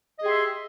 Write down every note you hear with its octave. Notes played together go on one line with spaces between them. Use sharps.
G4 G#4 D#5 E5 C6